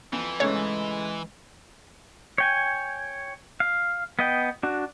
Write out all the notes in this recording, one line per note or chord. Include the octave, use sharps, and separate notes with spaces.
F2 E3
G#2 C#3 G#3 A3 C#5
C#5 G5 G#5
F5
B3 D#5 G5
D4 F#4